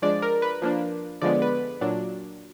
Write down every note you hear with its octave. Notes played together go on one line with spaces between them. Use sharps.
F3 G#3 D4 D5
A#4
B4
F3 A#3 D4
D3 F3 G#3 B3 D5
B4
A#2 F#3 D4